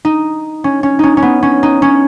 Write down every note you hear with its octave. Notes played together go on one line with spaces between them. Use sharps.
D#4
C#4
C#4
C#4 D#4
C#4
B3
C#4
D#4
C#4